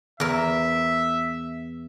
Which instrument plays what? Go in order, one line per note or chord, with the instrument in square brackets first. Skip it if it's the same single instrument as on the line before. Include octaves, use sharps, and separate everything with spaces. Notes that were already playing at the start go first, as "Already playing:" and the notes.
[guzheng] E2 A#4 [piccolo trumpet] E5